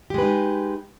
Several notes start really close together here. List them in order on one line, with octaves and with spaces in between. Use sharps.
G4 G#3 B4 D#4